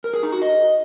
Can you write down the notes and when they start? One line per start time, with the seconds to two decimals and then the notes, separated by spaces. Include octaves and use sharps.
0.04 A#4
0.14 G#4
0.23 D#4
0.32 F#4
0.42 D#5